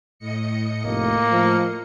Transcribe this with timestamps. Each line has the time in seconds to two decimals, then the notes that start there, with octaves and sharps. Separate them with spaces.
0.19 A2 D#5 C#7
0.85 F1 A#3
1.32 F3